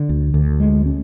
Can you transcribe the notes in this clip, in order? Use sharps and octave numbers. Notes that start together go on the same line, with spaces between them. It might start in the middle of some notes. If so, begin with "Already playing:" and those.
Already playing: D3
D2
D2
G#3
C#4